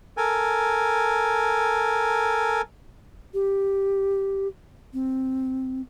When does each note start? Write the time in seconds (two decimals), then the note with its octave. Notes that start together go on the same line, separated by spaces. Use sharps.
0.17 A4 A#4 G#5
3.34 G4
4.94 C4